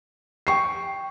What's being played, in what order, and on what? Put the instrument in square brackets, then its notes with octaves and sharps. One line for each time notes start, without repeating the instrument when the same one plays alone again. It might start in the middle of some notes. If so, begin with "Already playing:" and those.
[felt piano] G5 C#6 C7